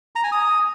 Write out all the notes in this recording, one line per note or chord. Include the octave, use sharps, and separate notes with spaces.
A#5
G#5
D#6